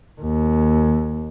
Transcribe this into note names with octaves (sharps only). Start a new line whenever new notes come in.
D#2